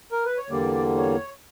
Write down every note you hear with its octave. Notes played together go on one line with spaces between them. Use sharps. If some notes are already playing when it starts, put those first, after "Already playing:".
A#4
B4
C#5
E2 D3 G3 A#3 D5
C#5